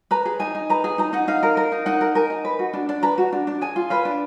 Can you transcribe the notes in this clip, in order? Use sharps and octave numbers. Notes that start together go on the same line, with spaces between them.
B4 A#5
G#4
D#4 G#5
D#4
B4 A#5
G#4
D#4 A#5
D#4 F#5
D#4 F5
A#4
A#4
D#4
D#4 F#5
A#4
A#4 G#5
D#4
B4
F#4
D4
D4
B4 A#5
F#4
D4
D4
G#4 G#5
F4
B4 F5
D4